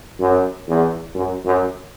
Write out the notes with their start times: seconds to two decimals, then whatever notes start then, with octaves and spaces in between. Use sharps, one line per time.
0.20 F#2
0.68 E2
1.15 F#2
1.45 F#2